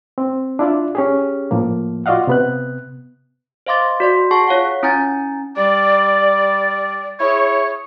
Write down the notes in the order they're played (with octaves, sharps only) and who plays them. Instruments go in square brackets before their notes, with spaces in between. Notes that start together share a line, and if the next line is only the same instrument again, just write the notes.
[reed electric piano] C4
D4 E4 F4 D5
C#4 G4 G#4
A2 F3 A#3
F4 F#4 D5 D#5 F5 F#5
C3 B3 F#6
[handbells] C5 D#5 F5 C6 D6 A6
F#4 D5 C6
G#4 F#5 A5 C#6 C7
F4 C#5 F5 F#5
C#4 E4 G#5 A#5 G6 A6
[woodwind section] G3 D5
E4 G#4 C#5